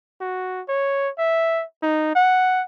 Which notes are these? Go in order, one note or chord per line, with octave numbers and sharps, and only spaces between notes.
F#4
C#5
E5
D#4
F#5